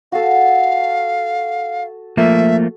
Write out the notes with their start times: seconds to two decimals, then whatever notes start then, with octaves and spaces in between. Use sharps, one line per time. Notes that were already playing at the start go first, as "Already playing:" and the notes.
0.12 F#4 A4 F5
2.17 F3 A3 A#3 E5